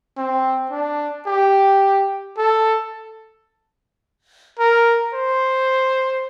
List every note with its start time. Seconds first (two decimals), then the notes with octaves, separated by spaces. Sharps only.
0.17 C4
0.71 D4
1.27 G4
2.38 A4
4.59 A#4
5.14 C5